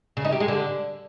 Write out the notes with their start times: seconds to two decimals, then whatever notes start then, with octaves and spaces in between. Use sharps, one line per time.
0.17 C#3
0.25 D#4
0.32 G4
0.40 G#3
0.48 D3